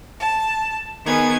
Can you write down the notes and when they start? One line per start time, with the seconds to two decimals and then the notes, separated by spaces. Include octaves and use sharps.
0.20 A5
1.05 D#3 B3 G#4 G#6